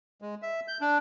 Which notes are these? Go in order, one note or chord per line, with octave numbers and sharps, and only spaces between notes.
G#3
E5
G6
D4